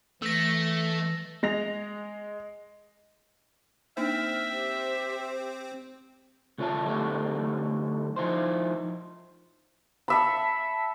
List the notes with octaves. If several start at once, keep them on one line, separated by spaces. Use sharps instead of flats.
E3 A3 E6 A#6
G#3 A#6 F7
A#3 C4 D4 D#4 E5 F6
G4 C5
C#2 D3 F4 C#5 E5 A5
D3 F#3 A3 D#4 F#4 G4
F3 D#4 E4 C5
A4 E5 B5